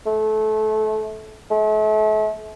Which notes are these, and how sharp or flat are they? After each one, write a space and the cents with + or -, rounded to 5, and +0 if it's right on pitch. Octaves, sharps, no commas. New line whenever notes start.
A3 -25
A3 -40